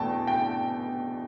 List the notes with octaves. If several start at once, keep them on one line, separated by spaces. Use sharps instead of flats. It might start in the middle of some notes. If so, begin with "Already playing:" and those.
Already playing: E2 B2 A3 G5 A5
G5